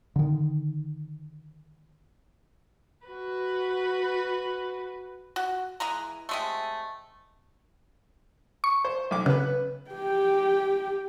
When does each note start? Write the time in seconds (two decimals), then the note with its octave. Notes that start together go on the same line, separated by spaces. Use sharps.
0.16 D3 D#3
3.06 F#4 B4
5.36 F#4
5.80 E3 G#3 A#5
6.29 C3 G#3 A3
8.64 C#6
8.85 C5
9.11 B1 D6
9.26 C#3 B3 B4
9.91 G4 G5